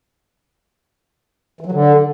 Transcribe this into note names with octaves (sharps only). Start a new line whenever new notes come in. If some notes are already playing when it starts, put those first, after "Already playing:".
E3
F#3
D3